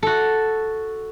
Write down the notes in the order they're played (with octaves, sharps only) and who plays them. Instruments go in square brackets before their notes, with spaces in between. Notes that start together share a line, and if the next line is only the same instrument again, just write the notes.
[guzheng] F#4 A4